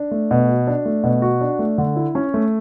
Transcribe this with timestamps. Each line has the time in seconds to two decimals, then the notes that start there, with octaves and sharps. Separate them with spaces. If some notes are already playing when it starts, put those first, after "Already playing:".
Already playing: D4
0.11 A3
0.31 B2
0.49 F#4
0.67 D4
0.85 A3
1.04 B2
1.22 F#4
1.41 D4
1.59 A3
1.78 D3
1.96 E4
2.15 C#4
2.34 A3